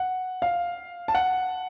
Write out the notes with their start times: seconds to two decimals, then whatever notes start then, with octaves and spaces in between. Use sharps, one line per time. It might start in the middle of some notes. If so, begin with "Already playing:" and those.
Already playing: F#5
0.42 F5
1.08 A5
1.15 F#5